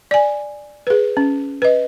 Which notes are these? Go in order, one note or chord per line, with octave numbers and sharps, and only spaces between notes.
D5 G#5
G#4 B4
C#4
B4 D#5